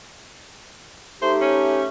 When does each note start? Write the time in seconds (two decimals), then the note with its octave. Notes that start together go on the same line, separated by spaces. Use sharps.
1.22 A3 D#4 G4 C5
1.41 C#4